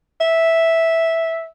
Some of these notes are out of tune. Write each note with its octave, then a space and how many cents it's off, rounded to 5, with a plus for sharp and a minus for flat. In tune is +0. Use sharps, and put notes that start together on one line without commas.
E5 -5